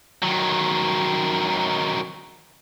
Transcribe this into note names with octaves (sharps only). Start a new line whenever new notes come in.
D#3 F#3